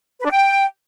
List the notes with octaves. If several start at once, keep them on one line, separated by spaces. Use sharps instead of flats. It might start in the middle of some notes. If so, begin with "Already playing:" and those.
B4
D4
G5